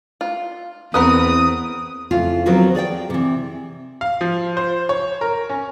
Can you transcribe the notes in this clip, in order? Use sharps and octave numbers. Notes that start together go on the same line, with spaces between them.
F4
E2 B3 C4 A#4 B4 D#6
F2 C#3 E4 F4
D#3 F3 F#3 B3 C4 A#4
G#4 D5 F5 G5
C3 E3
F5
F3
C5
C#5
A#4
C#4